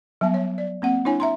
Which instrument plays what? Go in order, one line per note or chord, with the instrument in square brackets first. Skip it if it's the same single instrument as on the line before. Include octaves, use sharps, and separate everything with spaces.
[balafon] F#3 G3 B3 A5
C#5
D5
A#3 C4 F#5
D4 E4 C#5 G#5
E5 A#5 C6